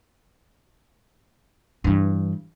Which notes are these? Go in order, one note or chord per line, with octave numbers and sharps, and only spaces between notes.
G2 E3